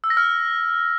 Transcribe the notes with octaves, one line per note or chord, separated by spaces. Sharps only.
E6
A#6
F6